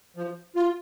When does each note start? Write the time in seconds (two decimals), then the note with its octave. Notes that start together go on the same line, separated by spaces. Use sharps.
0.17 F3
0.56 F4